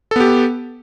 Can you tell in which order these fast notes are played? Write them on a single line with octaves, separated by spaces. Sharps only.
A4 B3 G4